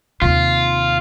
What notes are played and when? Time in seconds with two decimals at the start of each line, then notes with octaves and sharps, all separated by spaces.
0.22 D#2 C3 F4